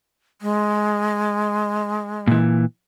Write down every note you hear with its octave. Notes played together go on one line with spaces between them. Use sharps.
G#3
A#2 E3